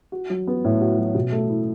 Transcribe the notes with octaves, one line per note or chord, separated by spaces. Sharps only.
F#4
F#3
B3
A2
F#4
F#3
B2
A3
E4